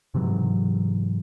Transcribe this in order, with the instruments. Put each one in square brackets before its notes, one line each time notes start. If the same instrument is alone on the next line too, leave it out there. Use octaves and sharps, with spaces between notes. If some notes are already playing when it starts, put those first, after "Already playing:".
[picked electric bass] G#2 C3 E3 F#3